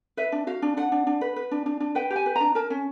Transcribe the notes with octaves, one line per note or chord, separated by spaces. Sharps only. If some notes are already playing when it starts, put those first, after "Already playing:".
B4 E5
D4
F#4 F5
D4
D4 F#5
D4
D4
B4
B4
D4
D4
D4
B4 G5
G4
G#5
B4
D4 A#5
A#4 A5
C#4